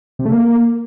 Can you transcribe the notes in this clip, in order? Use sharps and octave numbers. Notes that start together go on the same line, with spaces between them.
C3
A3
A#3